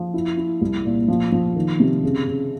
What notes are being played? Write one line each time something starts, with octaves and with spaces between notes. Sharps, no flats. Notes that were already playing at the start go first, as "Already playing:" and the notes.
Already playing: F3
E4
E4
C2
A#2
F3
F3
D#3
C3
C#3
C#3